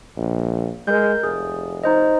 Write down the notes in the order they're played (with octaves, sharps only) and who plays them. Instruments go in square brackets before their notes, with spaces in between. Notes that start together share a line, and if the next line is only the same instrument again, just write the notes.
[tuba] A#1
[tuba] G#3 [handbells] A#4 G6
[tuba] F1 [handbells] G#4
[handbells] D#4 C5 D#5